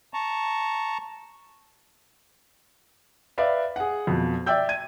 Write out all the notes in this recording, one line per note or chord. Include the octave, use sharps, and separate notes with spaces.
A5 A#5 C#6
B4 D5 E5 F5
G#4 F#5
F2 B2
D5 E5 G5 E6 G6
G#6 D#7